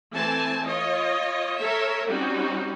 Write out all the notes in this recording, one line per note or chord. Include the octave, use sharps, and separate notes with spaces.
E3 A3 C4 G#5 A5
F4 C#5 D#5
A4 A#4 C#5 E5
G3 C4 C#4 D#4 F#4